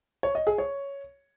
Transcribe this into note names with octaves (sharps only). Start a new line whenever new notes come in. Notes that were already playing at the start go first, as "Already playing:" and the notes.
C#5
D#5
G#4
C#5